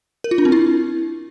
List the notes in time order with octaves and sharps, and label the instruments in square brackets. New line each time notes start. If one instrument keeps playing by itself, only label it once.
[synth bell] A#4
F4
D4
C4
E4